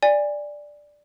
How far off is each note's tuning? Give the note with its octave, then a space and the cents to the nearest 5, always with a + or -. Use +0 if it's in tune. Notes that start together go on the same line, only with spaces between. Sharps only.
D5 +0 G#5 -25